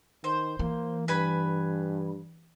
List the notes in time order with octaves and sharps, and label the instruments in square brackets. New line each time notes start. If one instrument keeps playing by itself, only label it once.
[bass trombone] D#3 [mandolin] C5
[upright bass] E3 [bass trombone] A#3
[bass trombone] G2 [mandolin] B4 G#5 B5